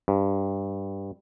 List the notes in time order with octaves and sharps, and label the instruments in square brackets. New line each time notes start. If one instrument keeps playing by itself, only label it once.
[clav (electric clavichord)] G2